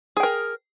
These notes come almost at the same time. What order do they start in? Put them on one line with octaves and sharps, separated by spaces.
G#4 G5 A#4